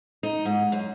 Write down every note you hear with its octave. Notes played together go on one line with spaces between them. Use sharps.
D#4
G#2
F#2